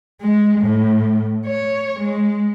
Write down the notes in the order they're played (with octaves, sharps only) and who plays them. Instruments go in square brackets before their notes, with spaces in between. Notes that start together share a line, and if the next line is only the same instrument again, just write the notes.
[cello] G#3
A2
C#5
G#3